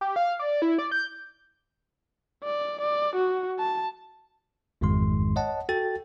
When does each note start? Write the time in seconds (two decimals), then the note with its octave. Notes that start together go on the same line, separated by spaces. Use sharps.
0.01 G4
0.16 F5
0.39 D5
0.62 E4
0.78 D5
0.91 G6
2.44 D5
2.81 D5
3.15 F#4
3.59 A5
4.81 G#1 F2 G#2 D#3 G#3 C6
5.36 C#5 D#5 F#5 A5
5.69 F#4 A4 G5 A6